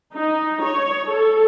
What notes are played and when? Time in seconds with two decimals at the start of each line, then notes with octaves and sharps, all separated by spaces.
0.14 D#4
0.65 C#5
1.09 A4